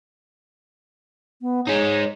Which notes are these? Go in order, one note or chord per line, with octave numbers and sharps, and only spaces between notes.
B3
G#3 D#4 C#5